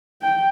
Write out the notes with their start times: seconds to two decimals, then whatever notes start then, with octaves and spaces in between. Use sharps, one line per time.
0.22 G5